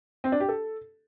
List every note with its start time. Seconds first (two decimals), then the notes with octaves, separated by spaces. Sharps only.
0.24 C4
0.32 D4
0.40 G4
0.49 A4